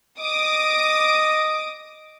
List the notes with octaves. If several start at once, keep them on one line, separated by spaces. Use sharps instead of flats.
D#5 D6 D#6